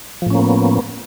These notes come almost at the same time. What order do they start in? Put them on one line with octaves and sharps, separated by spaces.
F3 A2 C#4 A#3 B3